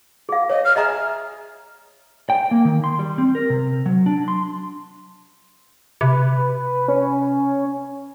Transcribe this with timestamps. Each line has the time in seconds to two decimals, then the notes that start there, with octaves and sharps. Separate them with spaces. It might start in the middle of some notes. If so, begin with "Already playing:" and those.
0.29 G#4 F5
0.49 C#5 D#5
0.64 F6
0.76 G#4 D#5 E5 A#5
2.30 G5
2.51 A#3
2.65 D#3
2.84 C6
2.99 G3
3.18 C4
3.35 A#4
3.50 C3
3.86 F#3
4.06 D4
4.28 C6
6.01 C3 B4
6.88 C#4